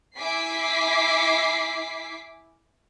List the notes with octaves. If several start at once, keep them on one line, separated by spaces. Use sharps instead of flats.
E4 E5 G#5 D6 B6 C7